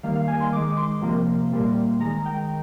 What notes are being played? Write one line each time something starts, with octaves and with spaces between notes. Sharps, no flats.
D#3 G3 A#3 F5
F5
G#5
C6
D#3 G#3 D6
C6
C3 F3 A#3
A#2 G3 A#3
D#3 G#3 A#5
G5